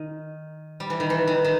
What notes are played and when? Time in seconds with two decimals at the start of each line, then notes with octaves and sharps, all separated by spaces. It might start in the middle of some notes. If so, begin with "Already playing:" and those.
Already playing: D#3
0.80 G3
0.90 E3
1.00 D#3
1.10 E3
1.27 D#3
1.45 D#3